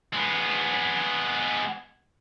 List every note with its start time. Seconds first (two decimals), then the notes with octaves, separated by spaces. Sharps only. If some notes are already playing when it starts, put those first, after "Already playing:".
0.13 G#3 B3